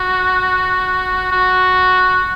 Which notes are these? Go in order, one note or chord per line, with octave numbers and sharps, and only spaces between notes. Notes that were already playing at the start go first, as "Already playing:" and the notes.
Already playing: F#4
F#4